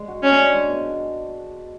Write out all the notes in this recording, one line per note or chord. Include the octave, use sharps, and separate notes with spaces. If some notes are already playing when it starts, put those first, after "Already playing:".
Already playing: G#3
F#4
C#4 D4
G#3
G#3
B2